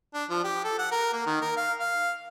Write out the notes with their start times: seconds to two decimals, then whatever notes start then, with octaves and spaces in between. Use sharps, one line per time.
0.14 D4
0.30 F3
0.44 G4
0.64 A4
0.78 F#5
0.92 A#4
1.13 A#3
1.27 D#3
1.42 A#4
1.57 F5
1.80 F5